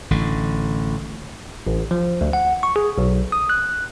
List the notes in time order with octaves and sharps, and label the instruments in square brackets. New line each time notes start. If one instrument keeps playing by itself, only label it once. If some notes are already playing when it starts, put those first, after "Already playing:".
[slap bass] A1 D3
[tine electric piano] A1
F3
D2
F#5
C#6
G#4
B1
D#6
F#6